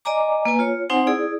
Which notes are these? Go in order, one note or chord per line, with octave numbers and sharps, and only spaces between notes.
D5 D#5 G#5 A#5 D6
A#3 B4 G#5
F4 C#5
C4 D#4 C5 F#5 G#5
E4 G#4 D5 D#6